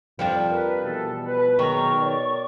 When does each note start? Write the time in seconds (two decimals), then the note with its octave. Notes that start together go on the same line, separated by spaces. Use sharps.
0.19 F2 F3 G3 D4
0.52 A#4 B4
0.84 B2 E3 E4 A4
1.25 B4
1.59 D#3 F#3 G#4 A#5 C#6
1.98 A#4 C#5 D5